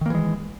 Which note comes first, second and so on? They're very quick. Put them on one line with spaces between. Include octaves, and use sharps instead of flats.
D#3 A#3 E3 G#3